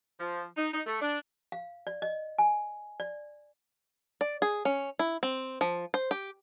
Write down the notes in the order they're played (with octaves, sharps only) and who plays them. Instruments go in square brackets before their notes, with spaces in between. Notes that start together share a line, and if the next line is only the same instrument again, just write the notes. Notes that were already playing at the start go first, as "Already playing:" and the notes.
[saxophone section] F3
D#4
D#4
A3
D4
[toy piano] F5
D5
D#5
G#5
D5
[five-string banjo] D5
G#4
C#4
E4
C4
F3
C5
G4